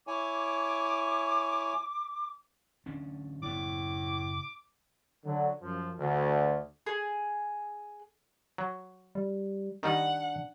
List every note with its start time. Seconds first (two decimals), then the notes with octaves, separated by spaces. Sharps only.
0.07 E4 C#5 G#5 D6
2.86 D1 C#4 D4
3.43 F#1 F#2 A2 B3 D6
5.25 D3 F#3
5.61 F#2 F3
5.98 D2
6.86 G#4
8.58 F#3
9.15 G3
9.83 D#3 G3 D4 D#4 F#5